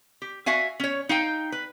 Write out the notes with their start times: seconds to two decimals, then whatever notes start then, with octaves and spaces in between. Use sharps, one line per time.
0.22 G4
0.46 F#4 E5 F5 G#5
0.80 C#4 C#5
1.09 D#4 F5 G5
1.52 B4